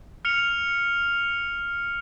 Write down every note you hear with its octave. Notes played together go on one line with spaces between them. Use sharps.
F6 C#7 F7